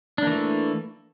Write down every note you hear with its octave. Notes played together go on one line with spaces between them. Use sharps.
E3 A3 A#3 D4